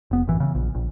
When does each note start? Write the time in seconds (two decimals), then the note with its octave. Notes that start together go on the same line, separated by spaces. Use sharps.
0.11 F1 B3
0.27 A1 F#2 E3
0.40 C#3 E3
0.55 A#1
0.75 A#1